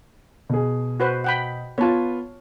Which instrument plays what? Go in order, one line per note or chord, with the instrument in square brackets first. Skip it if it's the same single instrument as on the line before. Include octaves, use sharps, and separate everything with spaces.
[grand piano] B2 G#4
[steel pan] F#4 B4 C5
F#5 G5 B5
[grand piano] B3 F4 [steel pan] C#5 A5